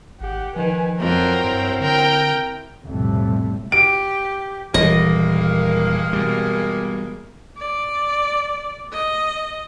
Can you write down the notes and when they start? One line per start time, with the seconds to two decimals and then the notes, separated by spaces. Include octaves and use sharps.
0.21 G#1 G4 F#5
0.56 D#3 F3 B4 G#5
1.00 F2 F#3 A#4 C5 G5
1.44 G2 C4 E4
1.81 D3 A#4 G5
2.85 B1 F2 A2 C3 G3 A3
3.72 G4 D7
4.74 D#1 G2 E3 G3 G#3 A#3 D#5
6.13 B2 G3
7.57 D5
8.93 D#5